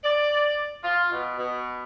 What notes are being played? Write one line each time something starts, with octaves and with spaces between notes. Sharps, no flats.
D5
F4
B2
B2